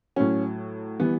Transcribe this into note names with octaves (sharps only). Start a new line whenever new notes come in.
A2 F#3 C#4
E3 G3 B3